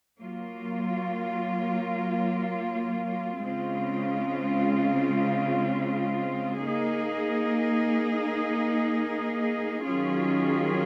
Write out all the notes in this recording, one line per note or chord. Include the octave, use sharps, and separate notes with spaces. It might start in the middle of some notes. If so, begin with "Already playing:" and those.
F#3 A#3 F4
C#3 G#3 C4 F4
A#3 D#4 G#4
D#3 F#3 C#4 F4 G#4